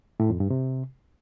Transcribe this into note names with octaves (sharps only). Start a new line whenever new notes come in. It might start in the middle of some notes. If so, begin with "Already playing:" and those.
A2
F2
G2
C3